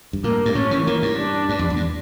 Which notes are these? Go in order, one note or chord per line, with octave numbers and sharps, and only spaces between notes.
G2
A2 A#3
G2
A2 C#4
E3
E3 A#3
G2
D4
G2
F2
E2
G2